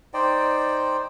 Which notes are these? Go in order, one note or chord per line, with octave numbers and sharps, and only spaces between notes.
D#4 C5 D5 G5